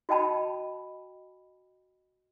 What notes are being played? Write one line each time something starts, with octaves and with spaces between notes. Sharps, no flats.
F#4 D#5 G5 A5 B5